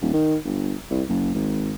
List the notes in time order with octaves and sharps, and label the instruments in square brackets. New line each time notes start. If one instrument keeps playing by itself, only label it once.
[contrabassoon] D#1
D#3
G1
C2
F#1
G#1